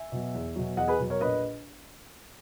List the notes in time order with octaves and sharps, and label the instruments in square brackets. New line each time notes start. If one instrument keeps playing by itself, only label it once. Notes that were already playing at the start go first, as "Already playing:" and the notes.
Already playing: [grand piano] E5 G#5
B2 F#3
E2
B2 F#3
E2 D#5 F#5
G#4 B4
B2 F#3
A#4 C#5
A#1 B4 D#5